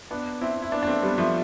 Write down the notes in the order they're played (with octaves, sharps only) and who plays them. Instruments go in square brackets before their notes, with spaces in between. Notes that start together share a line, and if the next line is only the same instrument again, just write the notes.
[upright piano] B3 D4
C4 E4
E4
B3 D4
D4
A3 C4
G3 B3
F3 A3